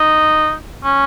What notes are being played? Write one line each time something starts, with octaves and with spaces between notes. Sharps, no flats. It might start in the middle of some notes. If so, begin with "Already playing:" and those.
Already playing: D#4
C#4